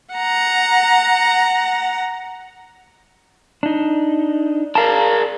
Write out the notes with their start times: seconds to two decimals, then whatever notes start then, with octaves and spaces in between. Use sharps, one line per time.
0.14 F#5 A#5
3.63 D4 D#4
4.75 G#4 A#4 D5 F5 A5